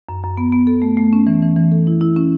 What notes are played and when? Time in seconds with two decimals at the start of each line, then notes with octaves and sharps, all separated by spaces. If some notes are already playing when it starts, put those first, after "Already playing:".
0.09 F#2
0.23 F#2
0.37 B3
0.52 B3
0.67 A4
0.82 A3
0.97 A3
1.13 C#4
1.27 E3
1.42 E3
1.56 E3
1.72 A4
1.87 E4
2.01 E4
2.16 C#4